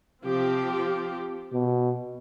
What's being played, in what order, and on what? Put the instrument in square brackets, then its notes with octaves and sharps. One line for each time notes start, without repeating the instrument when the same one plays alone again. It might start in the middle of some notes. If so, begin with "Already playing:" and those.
[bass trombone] C3 [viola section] F3 C4 G4
[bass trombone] B2